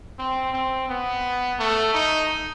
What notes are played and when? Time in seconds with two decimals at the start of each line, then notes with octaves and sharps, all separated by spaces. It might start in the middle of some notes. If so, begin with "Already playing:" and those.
0.19 C4
0.53 C4
0.89 B3
1.59 A3
1.94 D#4